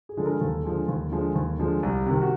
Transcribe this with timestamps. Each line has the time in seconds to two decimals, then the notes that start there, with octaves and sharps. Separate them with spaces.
0.09 G#4
0.17 D3 F3 G#3 A4
0.26 A#4
0.41 D#2 A4
0.64 D3 F3 G#3
0.89 D#2
1.12 D3 F3 G#3
1.35 D#2
1.59 D3 F3 G#3
1.83 C2
2.06 C3 D#3
2.21 F#4